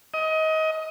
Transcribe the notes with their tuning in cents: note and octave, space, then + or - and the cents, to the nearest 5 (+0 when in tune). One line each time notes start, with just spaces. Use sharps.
D#5 +25